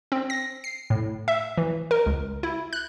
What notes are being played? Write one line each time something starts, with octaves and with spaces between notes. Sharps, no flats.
C4
A#6
C7
A2
E5
E3
A#4
C#2
E4
F#6